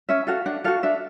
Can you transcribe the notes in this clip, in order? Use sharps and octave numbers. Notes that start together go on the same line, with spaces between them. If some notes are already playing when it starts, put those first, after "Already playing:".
C#4 E5
F#4 A4 F5
D4 F#5
F#4 A4 F5
D4 E5